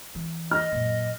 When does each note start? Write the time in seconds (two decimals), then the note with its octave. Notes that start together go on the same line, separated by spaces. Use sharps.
0.15 E3
0.51 D#5 F6
0.72 F#2 A#2